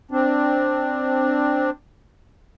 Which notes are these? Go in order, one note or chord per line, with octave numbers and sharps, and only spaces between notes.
C4 D4